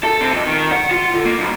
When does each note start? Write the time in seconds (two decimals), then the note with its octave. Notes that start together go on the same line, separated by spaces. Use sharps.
0.03 A4
0.21 C3
0.33 F2
0.46 D#3
0.72 F#5
0.91 F4
1.14 D3
1.25 A#3
1.39 B1